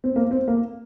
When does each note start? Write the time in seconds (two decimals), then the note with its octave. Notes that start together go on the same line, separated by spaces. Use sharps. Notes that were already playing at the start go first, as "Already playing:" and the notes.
0.04 C4
0.16 A#3
0.31 C4
0.48 A#3